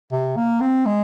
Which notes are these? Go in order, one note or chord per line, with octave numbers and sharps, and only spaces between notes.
C3
A#3
C4
G#3